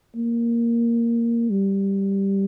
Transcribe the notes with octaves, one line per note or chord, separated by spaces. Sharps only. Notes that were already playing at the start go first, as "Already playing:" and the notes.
A#3
G3